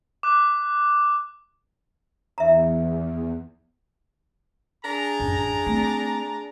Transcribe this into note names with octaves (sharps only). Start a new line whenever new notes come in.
D6 F#6
E2 E5 A#5
D4 G#4 A#5
A1 F#2
A3 C4